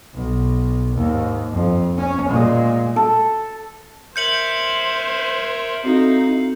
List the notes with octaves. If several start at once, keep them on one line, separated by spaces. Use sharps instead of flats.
B1
D#2 G#2
F2
C#4
A#2 G#3
A4
A#4 C5 C#5 E5 G6 C#7 F#7
C4 D#4 E4 F#4 A4 F5